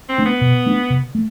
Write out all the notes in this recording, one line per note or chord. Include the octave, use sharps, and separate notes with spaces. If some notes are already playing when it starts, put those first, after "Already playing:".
C4
A3 D4
B3
B2
A3 D4
C3
A3